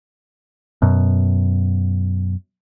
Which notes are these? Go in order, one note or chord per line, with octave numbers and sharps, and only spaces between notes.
F#2 B2